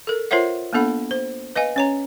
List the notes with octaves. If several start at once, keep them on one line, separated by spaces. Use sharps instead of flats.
A4 A#4
F4 A#4 C5 C#5 E5 F#5
A#3 B3 D4 A4 F#5 B5
C5
B4 D#5 F5 G#5
C#4 C#5 A#5